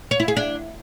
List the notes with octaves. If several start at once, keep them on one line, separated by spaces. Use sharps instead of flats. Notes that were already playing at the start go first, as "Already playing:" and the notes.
C#5
E4
G#4
D4